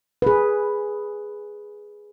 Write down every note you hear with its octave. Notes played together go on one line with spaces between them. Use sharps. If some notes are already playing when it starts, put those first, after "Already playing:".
G#4 B4